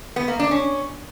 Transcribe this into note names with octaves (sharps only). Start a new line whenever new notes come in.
B3
A#3
D4
C#4